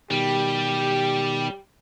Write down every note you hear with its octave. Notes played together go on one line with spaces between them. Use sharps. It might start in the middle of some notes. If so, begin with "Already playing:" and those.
B2 D#3 G3 G4